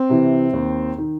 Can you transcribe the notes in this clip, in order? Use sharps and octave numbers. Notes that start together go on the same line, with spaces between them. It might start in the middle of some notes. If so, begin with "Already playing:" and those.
Already playing: C4
C3 E3
D#2
D#3